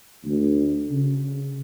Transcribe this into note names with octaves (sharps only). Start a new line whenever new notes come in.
D2
C#3